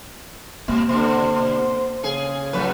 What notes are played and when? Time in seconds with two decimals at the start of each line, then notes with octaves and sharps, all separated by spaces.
0.68 B2 A#3
0.89 B2 D3 C5
2.03 C#3 G#4
2.53 A2 F#3 B4